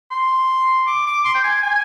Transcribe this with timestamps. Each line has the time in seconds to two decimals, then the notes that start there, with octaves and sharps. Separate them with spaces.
0.11 C6
0.87 D6
1.06 D6
1.25 C6
1.35 G5
1.44 G#5
1.63 G#5